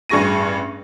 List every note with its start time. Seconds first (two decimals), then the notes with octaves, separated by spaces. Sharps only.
0.09 A1 G2 G#4 C#6 A#6 D#7